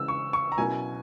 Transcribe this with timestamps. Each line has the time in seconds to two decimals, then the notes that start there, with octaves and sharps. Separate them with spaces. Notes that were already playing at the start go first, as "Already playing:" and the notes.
Already playing: C#3 E3 G#3 E6
0.08 C#6
0.33 C#6
0.52 A#5
0.58 B2 F#3 C#4 E4 A#4 G#5